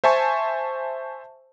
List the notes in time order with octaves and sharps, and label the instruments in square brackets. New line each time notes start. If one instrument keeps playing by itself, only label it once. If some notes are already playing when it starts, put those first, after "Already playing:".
[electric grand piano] C5 E5 G#5 A5 C#6